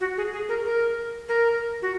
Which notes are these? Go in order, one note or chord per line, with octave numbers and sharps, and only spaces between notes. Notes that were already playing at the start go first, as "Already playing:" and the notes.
F#4
G#4
G#4
A#4
A#4
A#4
F#4